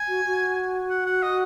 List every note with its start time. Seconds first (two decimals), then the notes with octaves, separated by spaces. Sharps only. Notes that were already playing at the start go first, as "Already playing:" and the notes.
Already playing: G#5
0.08 F#4
0.25 F#4
0.90 F#5
1.06 F#5
1.23 D#5